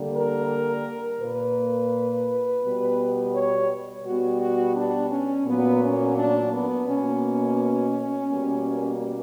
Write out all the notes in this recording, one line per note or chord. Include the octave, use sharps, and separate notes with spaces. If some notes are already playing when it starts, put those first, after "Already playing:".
Already playing: D3 G3 A#3
A#4
A#2 A#3 B4
B2 G3 B3
C#5
B2 G3 B3 F#4
F#4
D4
C#4
A#2 F#3 A#3 B3
C#4
D4
B3
B2 A#3 C#4
B2 G3 A#3